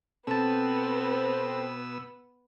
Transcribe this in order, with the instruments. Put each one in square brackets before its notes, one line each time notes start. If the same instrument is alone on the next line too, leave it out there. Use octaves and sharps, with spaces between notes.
[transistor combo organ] B2 E6 [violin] B3 [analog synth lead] C4 [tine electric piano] A4 A5